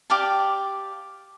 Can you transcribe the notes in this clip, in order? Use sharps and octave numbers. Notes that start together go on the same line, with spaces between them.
G4 D5 F5 A5